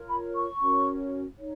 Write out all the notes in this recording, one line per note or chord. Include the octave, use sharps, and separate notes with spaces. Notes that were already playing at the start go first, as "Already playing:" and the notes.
Already playing: F4 A#4 C#5
B5
C#6
C#4 F#4 A#4 C#5
D#4 C#5